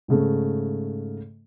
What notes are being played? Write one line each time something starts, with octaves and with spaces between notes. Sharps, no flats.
G#2 C#3 A3